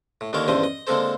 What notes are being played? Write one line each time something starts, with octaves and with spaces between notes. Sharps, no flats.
A2
D#2 D3 D#3 A#4 C#5 D6
A1 E2 G2 D3 C5 D#5
D#5
D3 G#3 A#3 C4 A4 C5